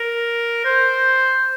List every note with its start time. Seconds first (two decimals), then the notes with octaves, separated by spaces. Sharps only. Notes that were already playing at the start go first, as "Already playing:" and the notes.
Already playing: A#4
0.65 C5